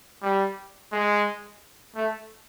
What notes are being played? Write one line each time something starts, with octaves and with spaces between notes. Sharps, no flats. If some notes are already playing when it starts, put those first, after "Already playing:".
G3
G#3
A3